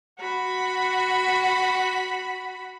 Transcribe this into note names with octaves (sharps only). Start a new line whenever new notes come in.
F#4 B5